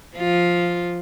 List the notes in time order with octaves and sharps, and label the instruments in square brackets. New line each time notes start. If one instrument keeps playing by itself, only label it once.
[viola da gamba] F3 F4